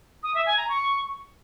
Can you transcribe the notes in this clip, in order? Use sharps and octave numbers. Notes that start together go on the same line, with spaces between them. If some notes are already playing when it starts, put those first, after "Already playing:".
D#6
E5
G#5
A#5
C#6